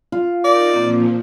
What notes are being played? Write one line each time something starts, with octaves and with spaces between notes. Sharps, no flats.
F4
D#4 A#4 D5
A#2 F3 A#3 C4